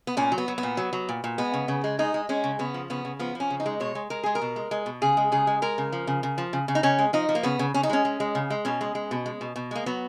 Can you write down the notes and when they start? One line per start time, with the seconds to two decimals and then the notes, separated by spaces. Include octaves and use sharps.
0.07 B3
0.17 A#2 C#4
0.32 F#3
0.38 B3
0.48 F#3
0.58 B3
0.63 A#2
0.77 F#3
0.93 F#3
1.09 A#2
1.24 A#2
1.38 G#3 B3
1.53 C#3
1.68 C#3
1.84 G#3
1.99 G#3 D#4
2.14 G#3
2.29 G#3 C#4
2.44 C#3
2.59 C#3 B3
2.74 F3
2.90 C#3 B3
3.05 C#3
3.19 F3 B3
3.35 F3 C#4
3.50 C#3
3.60 D#4
3.66 G#3
3.80 B2 C#5
3.95 G#3
4.10 G#3 A#4
4.23 G#3 G#4
4.35 A#4
4.42 B2
4.56 G#3
4.71 G#3
4.86 B2
5.02 C#3 G#4
5.17 G#3
5.32 C#3 G#4
5.47 G#3
5.62 G#3 A#4
5.78 C#3
5.92 F3
6.07 C#3
6.23 C#3
6.38 F3
6.53 C#3
6.68 C#3
6.75 D#4
6.83 C#3 C#4
6.98 G#3
7.13 F3 D#4
7.29 F3
7.35 A#3
7.43 C#3 B3
7.59 C#3
7.74 C#3 C#4
7.83 D#4
7.89 G#3 C#4
8.05 G#3
8.20 G#3
8.35 C#3
8.50 G#3
8.65 B2 C#4
8.81 G#3
8.95 G#3
9.11 B2
9.26 G#3
9.41 B2
9.56 B2
9.71 G#3 A#3
9.86 F#3 B3